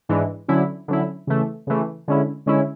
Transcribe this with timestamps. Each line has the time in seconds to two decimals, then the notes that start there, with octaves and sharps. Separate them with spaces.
0.09 G#2 E3 G#3 D4
0.48 D3 F#3 C#4 E4
0.88 D3 F#3 C#4 E4
1.27 C#3 E3 A3
1.67 C#3 E3 A3
2.08 D3 G#3 C#4 E4
2.46 D3 G#3 C#4 E4